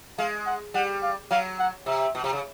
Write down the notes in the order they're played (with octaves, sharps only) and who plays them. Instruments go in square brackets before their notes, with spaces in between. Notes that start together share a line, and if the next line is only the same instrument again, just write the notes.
[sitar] G#3 [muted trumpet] F5
[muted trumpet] F#5
[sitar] G3 [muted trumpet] F#5
[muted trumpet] F5
[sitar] F#3 [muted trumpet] F5
[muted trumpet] F#5
[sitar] C3 [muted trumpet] E5
[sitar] B2
C3
C#3